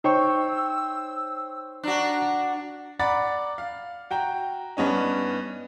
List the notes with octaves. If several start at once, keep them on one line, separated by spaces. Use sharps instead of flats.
D#4 C5 C#5 G5 C#6 E6
D4 F#4 A#5
D5 F#5 A#5 B5 D6 A6
F5
F#4 G5 A#5
G2 B3 C#4 D#4